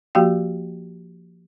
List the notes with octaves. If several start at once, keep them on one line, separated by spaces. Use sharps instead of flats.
F3 A#3 F#4 G4 F5 G5